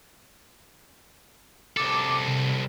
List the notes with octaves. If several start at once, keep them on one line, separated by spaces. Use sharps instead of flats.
C2 A4 D6
C3